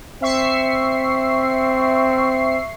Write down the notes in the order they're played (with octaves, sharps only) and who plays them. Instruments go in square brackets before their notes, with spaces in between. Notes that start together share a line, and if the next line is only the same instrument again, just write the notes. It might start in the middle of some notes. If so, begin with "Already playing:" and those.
[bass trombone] C4 [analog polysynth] E5 C#6 C7